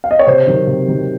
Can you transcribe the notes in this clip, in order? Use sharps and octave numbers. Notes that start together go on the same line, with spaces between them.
F5
D#5
C#5
C3 C5
D#3 F#3
C3
D#3 F#3